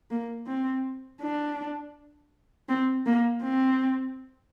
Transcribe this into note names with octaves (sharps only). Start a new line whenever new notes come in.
A#3
C4
D4
C4
A#3
C4